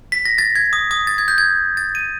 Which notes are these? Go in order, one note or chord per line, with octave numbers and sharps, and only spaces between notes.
B6
A#6
A6
G#6
D#6
D#6
A6
G#6
G6
G#6
A6
D#7